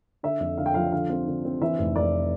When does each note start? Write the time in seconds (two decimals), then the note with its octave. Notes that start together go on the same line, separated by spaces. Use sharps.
0.23 D3 E5
0.40 F2
0.58 D3 F5
0.66 G5
0.74 F3 F5
0.92 D3 F5
1.10 C4
1.27 D3
1.45 C4
1.61 E3 E5
1.79 F1
1.96 F1 D5